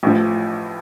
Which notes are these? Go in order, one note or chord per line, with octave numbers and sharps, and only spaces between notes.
A1 A2 F3